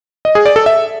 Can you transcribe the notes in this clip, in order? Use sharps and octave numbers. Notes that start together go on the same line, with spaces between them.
D#5
G#4
D5
A4
E5